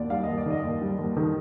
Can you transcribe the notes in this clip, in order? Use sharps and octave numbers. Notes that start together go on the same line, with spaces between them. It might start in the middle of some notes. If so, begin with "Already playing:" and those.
Already playing: D#2 D#3 D5
G3 F5
D#2 D#5
D5
D#3 D#5
D#2
G3
D#2
D#3